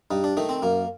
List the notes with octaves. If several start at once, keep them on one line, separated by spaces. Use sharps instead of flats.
G2 D#4
D4
D#3 A3 D#4
C4
F#2 A#3